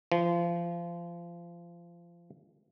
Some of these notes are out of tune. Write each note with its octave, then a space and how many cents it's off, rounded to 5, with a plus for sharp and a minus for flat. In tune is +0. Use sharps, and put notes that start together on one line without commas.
F3 -25